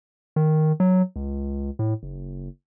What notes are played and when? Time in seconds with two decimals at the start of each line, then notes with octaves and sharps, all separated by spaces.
0.36 D#3
0.80 F#3
1.16 C#2
1.79 A2
2.03 F#1